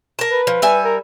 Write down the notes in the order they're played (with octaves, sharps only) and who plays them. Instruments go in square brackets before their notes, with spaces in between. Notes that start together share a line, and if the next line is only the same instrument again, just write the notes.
[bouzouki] A#4 A5
[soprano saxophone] B4
[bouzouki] F3
G3 E5 G#5
[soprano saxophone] A#4